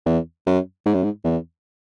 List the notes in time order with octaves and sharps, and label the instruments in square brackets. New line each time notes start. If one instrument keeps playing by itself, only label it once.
[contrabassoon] E2
F#2
G#2
F#2
G#2
E2